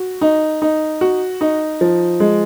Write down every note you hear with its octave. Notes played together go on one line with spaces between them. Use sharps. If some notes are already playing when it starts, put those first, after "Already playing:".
Already playing: F#4
D#4
D#4
F#4
D#4
F3
G#3